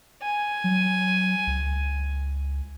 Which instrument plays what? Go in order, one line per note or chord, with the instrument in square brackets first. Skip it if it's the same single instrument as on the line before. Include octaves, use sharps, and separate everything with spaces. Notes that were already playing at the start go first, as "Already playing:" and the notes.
[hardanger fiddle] G#5
[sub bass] F#3
C#2